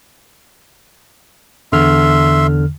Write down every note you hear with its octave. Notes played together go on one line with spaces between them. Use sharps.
E2 D3 E5 C6 F6